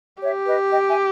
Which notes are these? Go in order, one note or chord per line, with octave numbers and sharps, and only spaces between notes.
G4 C#5 E5
B4 D#5
D#5 G5
E5 G#5